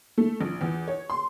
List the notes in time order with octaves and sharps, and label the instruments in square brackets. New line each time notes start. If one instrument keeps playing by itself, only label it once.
[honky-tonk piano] A3
A#1
E2
C#5
C6